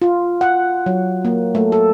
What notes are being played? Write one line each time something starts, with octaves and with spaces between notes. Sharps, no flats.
F4
F#5
F#3
A#3
A3
A4